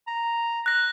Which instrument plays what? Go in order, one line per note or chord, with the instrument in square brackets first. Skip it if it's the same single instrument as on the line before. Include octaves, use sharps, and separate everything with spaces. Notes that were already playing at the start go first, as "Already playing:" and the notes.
[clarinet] A#5
[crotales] F#6 A#6